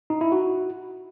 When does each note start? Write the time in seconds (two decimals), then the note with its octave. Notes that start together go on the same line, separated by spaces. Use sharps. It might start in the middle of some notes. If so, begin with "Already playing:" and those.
0.10 D#4
0.21 E4
0.32 F#4